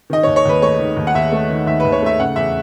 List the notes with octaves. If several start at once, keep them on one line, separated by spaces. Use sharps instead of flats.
D#3 D#5
D#2 C#5
C#5
D#2 B4
A3 C#5
D#3
D#2
F#5
D#2 E5
A3
D#3
D#2 E5
D#2 B4
C#5
A3 E5
C#3 F#5
E2 E5